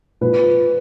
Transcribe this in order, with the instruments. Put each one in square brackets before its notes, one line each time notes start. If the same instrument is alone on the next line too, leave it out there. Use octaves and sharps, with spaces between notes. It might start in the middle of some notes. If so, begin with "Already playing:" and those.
[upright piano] A#2 F3 B4